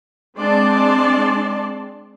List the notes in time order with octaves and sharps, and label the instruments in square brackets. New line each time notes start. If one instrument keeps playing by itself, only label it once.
[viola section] G#3 C4 D4 D5 A5 C6